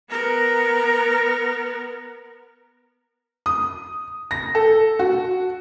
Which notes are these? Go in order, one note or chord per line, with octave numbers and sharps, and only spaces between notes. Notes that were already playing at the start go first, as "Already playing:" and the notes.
B3 A#4
D#6
A#6
A4
F#4